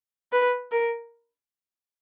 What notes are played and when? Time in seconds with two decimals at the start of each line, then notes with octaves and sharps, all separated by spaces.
0.32 B4
0.72 A#4